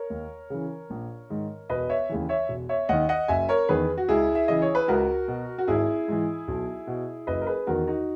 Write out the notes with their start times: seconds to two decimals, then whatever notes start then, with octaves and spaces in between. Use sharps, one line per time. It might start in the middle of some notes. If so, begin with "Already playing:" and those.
Already playing: A#4 C#5
0.10 D#2
0.50 C#3 E3
0.90 A#1
1.30 G#2 D#3
1.70 E1 B4 D#5
1.90 C#5 E5
2.09 D#2 C#3 E3
2.29 C#5 E5
2.49 E1
2.69 C#5 E5
2.89 D#2 D#3 D#5 F#5
3.09 D#5 F#5
3.28 F#1 E5 G#5
3.49 A#4 C#5
3.69 E2 D#3 G#4 B4
3.97 F#4
4.09 C#2 E4 G#4
4.35 E5
4.48 C#3 E3 D#5
4.62 C#5
4.75 B4
4.88 C#2 F#4 A#4
5.28 B2
5.58 F#4
5.68 G#1 E4 G#4
6.08 G#2 E3
6.48 B1
6.87 B2
7.27 F#1 B4 D#5
7.41 A#4
7.47 G#4 B4
7.67 E2 D#3 F#4 A#4
7.87 D#4 F#4